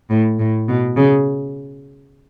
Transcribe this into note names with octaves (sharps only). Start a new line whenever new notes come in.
A2
A2
B2
C#3